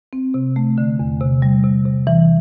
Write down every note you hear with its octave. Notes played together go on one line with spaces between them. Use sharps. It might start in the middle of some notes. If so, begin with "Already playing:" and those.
C4
C3
A3
D3
E2
C3
G3
C3
C3
E3